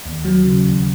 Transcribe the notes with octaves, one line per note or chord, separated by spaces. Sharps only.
D#2
F#3
C#3
D#2